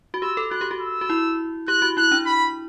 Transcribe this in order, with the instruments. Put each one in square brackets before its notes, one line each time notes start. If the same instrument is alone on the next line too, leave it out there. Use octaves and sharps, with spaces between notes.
[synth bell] F#4
[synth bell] G4 [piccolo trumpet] E6
[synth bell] A4
[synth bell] F#4 [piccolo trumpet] F#6
[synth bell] G4
F#4
[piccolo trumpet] E6
[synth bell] F#4
E4
[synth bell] G4 [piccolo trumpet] F#6
[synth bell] F#4
[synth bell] E4 [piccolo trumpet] F#6
[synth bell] D4
[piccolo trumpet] B5